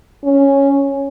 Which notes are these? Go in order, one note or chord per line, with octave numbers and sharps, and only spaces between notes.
C#4